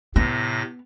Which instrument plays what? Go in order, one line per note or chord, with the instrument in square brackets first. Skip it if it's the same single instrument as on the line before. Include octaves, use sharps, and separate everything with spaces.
[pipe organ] A2 C3 A#6 [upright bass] B3